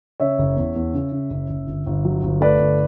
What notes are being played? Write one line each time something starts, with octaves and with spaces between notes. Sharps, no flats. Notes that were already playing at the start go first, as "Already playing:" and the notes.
C#3 C#5 E5
F#1
E2
E2
C#3
C#3
F#1
F#1
G1
G1
F#3
G1
A3 B4 D5
G1